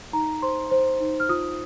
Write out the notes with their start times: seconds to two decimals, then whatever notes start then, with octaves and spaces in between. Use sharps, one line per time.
0.13 D#4 A#5
0.42 C5 C6
0.71 C5
1.00 D#4
1.20 F6
1.29 F4 D#6